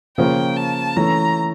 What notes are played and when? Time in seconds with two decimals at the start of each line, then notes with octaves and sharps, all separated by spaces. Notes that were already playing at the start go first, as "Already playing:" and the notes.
0.18 C#3 F3 A#3 C#4 F4 G5
0.57 A5
0.96 E3 A3 C#4 A#5